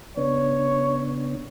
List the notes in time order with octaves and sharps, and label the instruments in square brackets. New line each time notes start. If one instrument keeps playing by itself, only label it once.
[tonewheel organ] C#3 B3 D4 [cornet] C#5